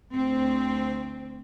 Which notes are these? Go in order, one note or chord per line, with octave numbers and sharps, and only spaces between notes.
D2 C4